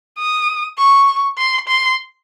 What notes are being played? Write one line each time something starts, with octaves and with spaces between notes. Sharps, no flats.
D#6
C#6
C6
C6